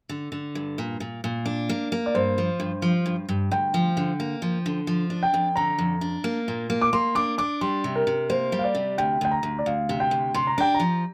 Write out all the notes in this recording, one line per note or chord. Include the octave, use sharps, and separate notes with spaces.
D3
D3
G2
A#2
A#2
A#2
D4
A#3
A#3
D5
G2 C5
F3
G2
F3
G2
G2
D2 G5
F3
D3
A#3
F3
D3
F3
D4
G5
F2
D3 A#5
F2
D4
A#3
A#2
A#3
D6
A#3 C6
D4 D6
D4 D6
G3 C6
C3
A#4
C3
A#3 C5
G3
F5
D5
C3
D2 G5
D2 G5
A#5
D2
D5
D2 F5
C3
G5
D2
C3 C6
A#5
D4 G5
A#5
F3